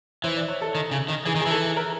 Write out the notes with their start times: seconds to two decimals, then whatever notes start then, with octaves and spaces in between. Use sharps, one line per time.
0.24 E3 C5
0.37 D5
0.48 C#5
0.61 A4
0.75 D#3
0.91 C#3
1.08 D#3
1.25 E3 G#4
1.35 D#3
1.40 G#4
1.46 E3
1.51 A4
1.76 A#4